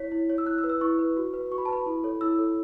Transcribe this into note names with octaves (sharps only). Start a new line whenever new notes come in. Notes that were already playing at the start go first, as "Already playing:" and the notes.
Already playing: E4 C#5 B6
E4
C#5
E6
E4 F#6
E6
B4
E6
E4 C#6
B4
F#4
B4
F#4 C#6
B5
A5
B4 B5
E4
A4 C#5
E4 E6
A4 C#5